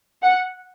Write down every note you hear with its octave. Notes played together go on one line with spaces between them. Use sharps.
F#5